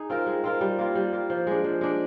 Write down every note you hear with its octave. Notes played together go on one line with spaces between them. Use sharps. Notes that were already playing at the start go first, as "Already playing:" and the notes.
Already playing: D#4 G#4
C4 F4 A#4
G#3
C4 F4 A#4
G3
A#3 F4
G3
A#3 F4
F3
G#3 D4
F3
G#3 D4